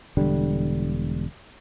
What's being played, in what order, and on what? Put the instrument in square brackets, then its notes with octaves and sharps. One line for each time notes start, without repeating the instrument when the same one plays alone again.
[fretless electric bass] E1 D3 G3